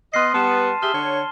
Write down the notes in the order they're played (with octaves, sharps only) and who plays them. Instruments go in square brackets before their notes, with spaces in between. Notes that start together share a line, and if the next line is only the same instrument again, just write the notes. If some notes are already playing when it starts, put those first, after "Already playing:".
[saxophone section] B3 D#5 [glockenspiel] C6 F6 C7
[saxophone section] G3 B3 [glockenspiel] A5 E7
[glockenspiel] A6 D#7
[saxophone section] G4 G#4 E5 [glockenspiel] F6 G7
[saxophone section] D3 C#5